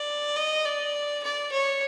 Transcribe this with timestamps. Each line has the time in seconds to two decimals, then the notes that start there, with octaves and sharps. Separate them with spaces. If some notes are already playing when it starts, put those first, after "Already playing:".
Already playing: D5
0.36 D#5
0.65 D5
1.23 D5
1.52 C#5